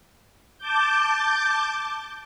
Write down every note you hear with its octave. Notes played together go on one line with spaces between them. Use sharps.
A5 D6 G6